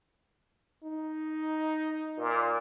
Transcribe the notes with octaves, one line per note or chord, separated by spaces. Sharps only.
D#4
A#2